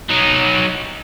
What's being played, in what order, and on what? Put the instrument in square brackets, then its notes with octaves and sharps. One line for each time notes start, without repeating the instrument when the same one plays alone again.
[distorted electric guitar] F#3 D#4